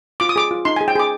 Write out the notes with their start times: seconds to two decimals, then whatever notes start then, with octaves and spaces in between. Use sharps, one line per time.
0.20 F4 D6
0.29 D#6
0.36 G#4 D6
0.51 F4
0.65 D#4 C6
0.76 G#5
0.81 G#4
0.88 G5
0.96 G#4 D6